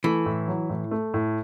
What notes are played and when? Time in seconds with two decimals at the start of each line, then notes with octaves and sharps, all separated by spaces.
0.04 E3 A3
0.26 A2
0.48 F#3
0.70 A2
0.91 A3
1.14 A2